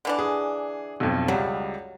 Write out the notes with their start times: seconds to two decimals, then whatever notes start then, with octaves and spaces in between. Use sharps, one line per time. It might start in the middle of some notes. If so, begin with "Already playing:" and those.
0.05 D3 E3 D4
0.19 G#4
1.00 B1 F2
1.28 C#2 F#3 G3